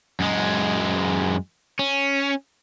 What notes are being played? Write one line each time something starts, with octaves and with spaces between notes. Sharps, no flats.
F#2 G#3
C#4